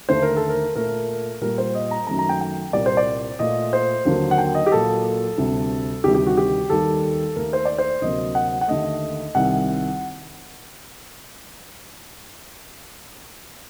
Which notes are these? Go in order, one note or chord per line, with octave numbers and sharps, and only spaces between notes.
D#2 D3 A3 C5
A#4
A4
A#4
A#2 A3 A#4
A#2 G3 A#3 A#4
C5
D#5
A#5
F#2 D#3 A3 A#5
A#5
G5
G5
C2 A#2 G3 A#3 D5
C5
D5
A#2 A3 D#5
C5
D#2 D3 F#3 A#3
F#5
G5
D#5
G4
A#2 F#3 A#3 A4
D2 C3 G3
D2 C3 D#3 G3 G4
G4
F#4
G4
D#2 D#3 G3 A4
D#2 D#3 A3 A#4
C5
D5
C5
D2 C3 F#3 A#3 D#5
F#5
F#5
D#2 D3 A3 D#5
C2 C3 D#3 F#5